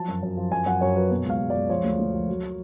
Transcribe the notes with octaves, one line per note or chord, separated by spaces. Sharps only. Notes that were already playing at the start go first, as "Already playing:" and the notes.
Already playing: F3 F#3 A5
F#2
F#2
F3
F#2 G#5
F#2 F#5
F#2 C#5
F#3 B4
B2 C#5
C#2 F5
C#2
C#2 D5
F3 C#5
D2
D2
F3
F#3
F#3